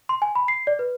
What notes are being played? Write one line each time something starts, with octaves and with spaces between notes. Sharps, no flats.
C6
G#5
B5
C7
D5
B4